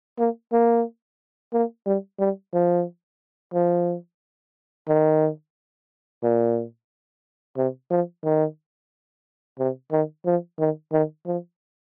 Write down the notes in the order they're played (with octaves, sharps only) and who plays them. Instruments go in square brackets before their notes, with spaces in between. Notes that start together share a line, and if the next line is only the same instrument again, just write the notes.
[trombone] A#3
A#3
A#3
G3
G3
F3
F3
D#3
A#2
C3
F3
D#3
C3
D#3
F3
D#3
D#3
F3